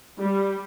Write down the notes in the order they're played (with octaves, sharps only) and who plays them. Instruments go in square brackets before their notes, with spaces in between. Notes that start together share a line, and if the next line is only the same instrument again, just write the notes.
[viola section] G3